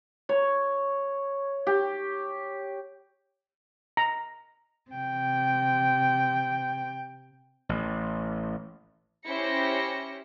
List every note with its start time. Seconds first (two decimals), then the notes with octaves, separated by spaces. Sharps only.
0.29 C#5
1.67 G4
3.97 A#5
4.91 C3 G5
7.69 A1
9.26 C#4 E4 G4 C5 A#6 C#7